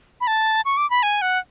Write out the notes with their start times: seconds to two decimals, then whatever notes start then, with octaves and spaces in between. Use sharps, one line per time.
0.21 B5
0.27 A5
0.65 C#6
0.77 D6
0.90 B5
1.03 G#5
1.22 F#5